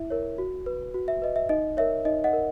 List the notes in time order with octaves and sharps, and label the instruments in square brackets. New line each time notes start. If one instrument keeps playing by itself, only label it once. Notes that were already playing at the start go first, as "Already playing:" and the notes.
Already playing: [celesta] E4 E5
A#4 C#5
F#4
B4
F#4
E5
B4 D#5
E5
D#4 D#5
A#4 C#5 E5
D#4 D#5
D#5 F#5
A#4